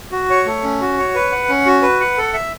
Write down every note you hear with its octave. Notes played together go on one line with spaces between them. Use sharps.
F#4
C#5
A3
C#4
F#4
C#5
B4
F#5
C#4
F#4
B4
F#5
A4
E5